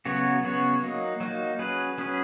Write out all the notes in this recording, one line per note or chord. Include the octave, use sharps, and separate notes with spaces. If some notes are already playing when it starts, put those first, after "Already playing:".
C#3 F#3 B3 F#4 C#5
C#3 F#3 B3 F#4 C#5
F#3 A#3 D#4
F#3 A#3 D#4
F#3 C#4 G#4 B4
F#3 C#4 G#4 B4